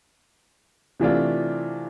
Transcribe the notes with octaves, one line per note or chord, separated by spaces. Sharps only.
C3 E3 A3 D4 F4